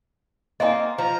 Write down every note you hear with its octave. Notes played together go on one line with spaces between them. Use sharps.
A#3 C4 D#4 D#5 G#5
F3 A#5